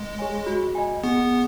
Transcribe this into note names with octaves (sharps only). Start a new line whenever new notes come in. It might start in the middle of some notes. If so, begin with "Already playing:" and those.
Already playing: G#3
G#4 C#5 G#5
F#4
D#5 G#5
B3 G#4